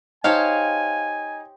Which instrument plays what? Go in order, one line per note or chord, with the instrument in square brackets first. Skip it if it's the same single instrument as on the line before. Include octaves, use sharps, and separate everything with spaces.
[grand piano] D#4 [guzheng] G4 C5 C#5 [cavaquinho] F5 A5 [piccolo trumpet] G#5